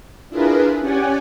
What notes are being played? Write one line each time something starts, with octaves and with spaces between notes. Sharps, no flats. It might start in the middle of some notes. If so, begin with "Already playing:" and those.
D4 E4 F4 G#4 A#4 B4
C#4 G4 D5 F#5 G#5